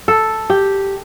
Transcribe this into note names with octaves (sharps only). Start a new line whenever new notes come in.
A4
G4